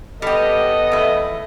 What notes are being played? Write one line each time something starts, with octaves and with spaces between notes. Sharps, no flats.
G3 B3 G4 A4 D#5
E2 A3